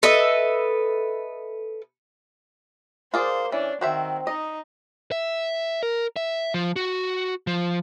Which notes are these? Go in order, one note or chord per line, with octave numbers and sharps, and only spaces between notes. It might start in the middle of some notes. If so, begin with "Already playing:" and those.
A4 B4 D#5 E5
A#3 F4 G#4 C5 D5
E3 C#4 D4
D#3 C4 F#4 C5 E5
D#4 D#5
E5
A#4
E5
F3
F#4
F3